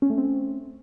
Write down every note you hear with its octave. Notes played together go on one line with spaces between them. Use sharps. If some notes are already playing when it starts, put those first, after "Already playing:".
C#4
A3
C4